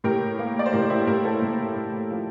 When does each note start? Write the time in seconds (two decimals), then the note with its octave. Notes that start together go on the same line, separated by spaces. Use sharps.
0.04 A2 G4 A#4
0.39 A#3
0.59 D5
0.66 C5
0.73 A2 G4 A#4
0.90 E4 G4
1.07 A2 G4 A#4
1.25 A4 C5
1.42 A2
1.76 A2
2.11 F3